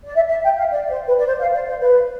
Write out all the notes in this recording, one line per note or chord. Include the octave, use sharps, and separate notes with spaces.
D5
E5
E5
G5
F5
D5
C5
B4
D5
C5
F5
D5
C5
B4